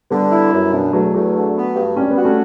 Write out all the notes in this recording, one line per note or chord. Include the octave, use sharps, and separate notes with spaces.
D3 G3 B3
E4
F#2
B2 B3 D4
E2 F#3 A3
E2 F#3 A3
D3
B3
G2
G3 C#4
B3
F#4
A3 C#4